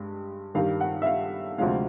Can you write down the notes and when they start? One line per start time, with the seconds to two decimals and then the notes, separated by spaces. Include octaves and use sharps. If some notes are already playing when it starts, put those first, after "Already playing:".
Already playing: G2 G#3
0.55 G2 D#3 G3 F5
0.81 F#5
1.02 E5
1.06 F5
1.58 D2 C3 F3 G#3 F5